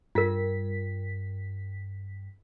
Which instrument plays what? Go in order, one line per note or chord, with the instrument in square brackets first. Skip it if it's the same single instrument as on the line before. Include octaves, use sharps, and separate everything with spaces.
[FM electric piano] G2 B6 [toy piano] F4 A#4